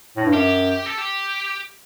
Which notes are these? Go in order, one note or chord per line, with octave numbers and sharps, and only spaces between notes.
A2
G2
F#2 G4
A4
G4